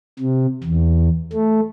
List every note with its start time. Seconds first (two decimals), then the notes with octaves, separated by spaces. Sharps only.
0.19 C3
0.64 E2
1.33 A3